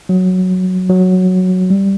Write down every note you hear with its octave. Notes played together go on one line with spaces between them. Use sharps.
F#3
F#3
G3